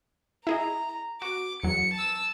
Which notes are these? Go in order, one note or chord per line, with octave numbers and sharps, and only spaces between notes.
E4 G#4 D#5 A#5
F#4 D6
E2 F#3 C#7
A5 E6